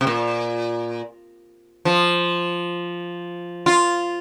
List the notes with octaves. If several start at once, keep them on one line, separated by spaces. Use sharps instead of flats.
C3
A#2
F3
F4